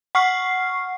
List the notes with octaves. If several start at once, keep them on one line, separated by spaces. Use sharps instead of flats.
F#5 C#6 F6 C7